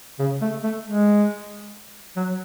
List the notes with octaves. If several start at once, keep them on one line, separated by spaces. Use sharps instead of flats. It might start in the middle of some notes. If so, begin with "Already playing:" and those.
C#3
A3
A3
G#3
F#3